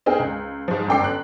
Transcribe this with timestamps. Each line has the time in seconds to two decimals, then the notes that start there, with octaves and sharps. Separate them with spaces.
0.06 C4 D#4 G#4 A#4 G5
0.19 C#2
0.68 G#2 F3
0.87 G1 F#2 A4 G5 D6 C7
1.04 F#6